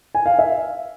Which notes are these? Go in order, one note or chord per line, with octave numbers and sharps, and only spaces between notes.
G#5
F5
E5